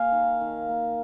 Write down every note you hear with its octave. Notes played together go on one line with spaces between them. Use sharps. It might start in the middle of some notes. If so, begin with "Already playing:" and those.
Already playing: A#3 F5 G#5
D#3
D#3
A#3